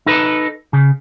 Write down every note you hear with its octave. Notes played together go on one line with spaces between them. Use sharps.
D#4 A4 B4
C#3